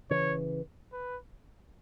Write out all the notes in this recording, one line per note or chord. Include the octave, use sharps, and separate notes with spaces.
C#3 E3 C#5
B4